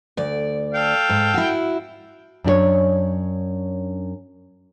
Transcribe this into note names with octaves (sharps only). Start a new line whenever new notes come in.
D2 D5
A4 F5 G5
G#2
E4 F#4
F#2 D4 G4 C#5